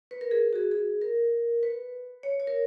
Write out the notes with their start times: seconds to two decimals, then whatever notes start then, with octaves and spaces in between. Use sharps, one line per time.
0.11 B4
0.21 A#4
0.31 G#4
0.53 F#4
0.56 G#4
0.71 G#4
1.02 A#4
1.63 B4
2.23 C#5
2.40 C#5
2.47 A#4